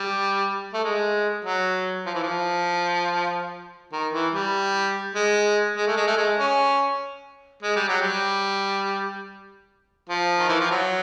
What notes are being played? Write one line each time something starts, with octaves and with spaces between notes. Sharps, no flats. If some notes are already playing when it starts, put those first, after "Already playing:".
Already playing: G3
A3
G#3
F#3
F3
E3
F3
D#3
E3
G3
G#3
G#3
A3
G#3
A3
G#3
C#4
G#3
G3
F#3
G3
F3
D#3
E3
F3
F#3